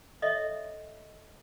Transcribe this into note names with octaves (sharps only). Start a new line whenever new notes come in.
A4 C#5 D#5 E5 F#5